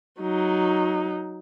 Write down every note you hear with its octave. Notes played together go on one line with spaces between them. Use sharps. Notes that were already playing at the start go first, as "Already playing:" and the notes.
F#3 D#4